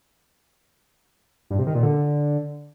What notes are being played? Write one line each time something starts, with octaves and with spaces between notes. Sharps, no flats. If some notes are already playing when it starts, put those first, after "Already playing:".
G2
C3
D#3
A#2
D3